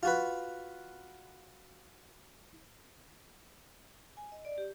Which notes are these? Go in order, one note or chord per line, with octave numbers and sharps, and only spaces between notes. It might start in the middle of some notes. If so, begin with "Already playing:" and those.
F4 F#4 B4
G#5
D#5
D5
G4